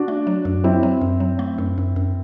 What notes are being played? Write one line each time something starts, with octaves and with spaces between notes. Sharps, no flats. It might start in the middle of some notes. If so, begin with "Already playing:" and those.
Already playing: D4 F#4
A3
F#3
F#2
F#3 C4 E4
F#3
F#2
F#3
A3
F#2
F#2
F#2